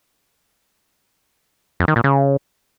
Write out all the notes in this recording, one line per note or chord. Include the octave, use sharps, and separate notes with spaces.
F2
D#3
A#2
C#3